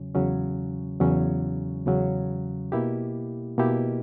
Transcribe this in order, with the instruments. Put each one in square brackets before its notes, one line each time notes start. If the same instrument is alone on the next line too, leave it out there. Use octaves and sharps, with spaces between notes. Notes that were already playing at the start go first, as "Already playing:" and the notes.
Already playing: [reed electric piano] E2 C#3 F#3 C#4
E2 C#3 F#3 C#4
E2 C#3 F#3 C#4
E2 C#3 F#3 C#4
B2 A#3 E4 G4
B2 A#3 E4 G4